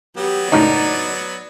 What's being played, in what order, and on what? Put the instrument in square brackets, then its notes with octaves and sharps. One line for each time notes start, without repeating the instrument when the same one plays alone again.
[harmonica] F#3 B3 [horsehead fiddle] G4
[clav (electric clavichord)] C#2 F#2 A2 [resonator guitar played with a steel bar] D#4 [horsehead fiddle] D5